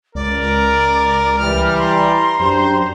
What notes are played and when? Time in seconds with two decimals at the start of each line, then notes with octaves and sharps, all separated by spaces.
0.15 C#2 A#4 D5
1.39 E3 G3 F6
1.78 A#5 C6
2.40 F#2 D4 G4 C5